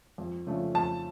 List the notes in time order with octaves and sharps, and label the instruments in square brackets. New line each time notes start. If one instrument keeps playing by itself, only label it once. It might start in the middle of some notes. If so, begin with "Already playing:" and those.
[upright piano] F2
C#3 F3 A3 D4
[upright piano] F2 [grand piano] A5